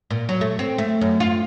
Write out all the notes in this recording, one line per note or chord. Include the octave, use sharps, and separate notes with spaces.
A#2
F#3
A3
C4
A3
F#2
F4